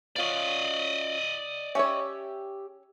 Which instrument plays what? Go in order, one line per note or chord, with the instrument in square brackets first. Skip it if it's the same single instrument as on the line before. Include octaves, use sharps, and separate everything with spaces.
[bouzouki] C#4 F4 F#4 [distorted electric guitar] D5 D#5
[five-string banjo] C#4 C#5 [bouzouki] G4 E5